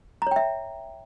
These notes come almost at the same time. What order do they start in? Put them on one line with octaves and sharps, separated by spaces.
A#5 C#5 G5 E5